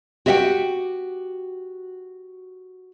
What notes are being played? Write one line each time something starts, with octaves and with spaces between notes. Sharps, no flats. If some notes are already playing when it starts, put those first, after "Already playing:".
F#4 G4 D#5 E5 F#5 G5